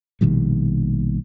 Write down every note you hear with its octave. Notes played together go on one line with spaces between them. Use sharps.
A#1 B2 D#3 G3